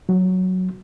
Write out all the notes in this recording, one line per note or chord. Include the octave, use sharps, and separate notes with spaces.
F#3